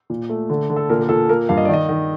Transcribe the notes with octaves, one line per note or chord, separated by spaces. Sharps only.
A#2
A3
D3
D3
A4
A#2 A#4
A#4
A#2 A4
A#3 A#4
G2 F5
D#5
D5
D#3 D#5
D#3